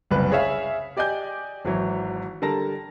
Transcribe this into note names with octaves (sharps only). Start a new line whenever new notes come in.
F#1 C2 B4
G#4 C#5 E5 F5
G4 D5 D#5 G#5 G6
G#1 E3 F#3
D3 G3 A#4 A5 A#6